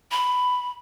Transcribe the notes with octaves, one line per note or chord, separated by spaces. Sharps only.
B5